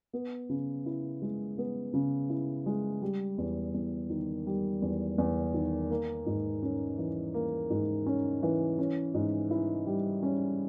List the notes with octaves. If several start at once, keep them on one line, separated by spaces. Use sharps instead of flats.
B3
C#3
E4
G#3
B3
C#3
E4
G#3
G3
E2
E2
D#3
G3
E2
E2
D#3
A#3
G#2
C#4
E3
A#3
G#2
C#4
E3
C#4
G#2
E4
G3
C#4